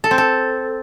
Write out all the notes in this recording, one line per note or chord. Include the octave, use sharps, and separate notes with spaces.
A4
C4
A4